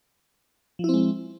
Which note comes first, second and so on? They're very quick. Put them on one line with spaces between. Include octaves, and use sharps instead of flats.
F3 E4 C4 G#3